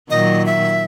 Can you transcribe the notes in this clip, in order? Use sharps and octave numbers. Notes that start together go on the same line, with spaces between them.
A#2 D#3 F#3 D#5
E5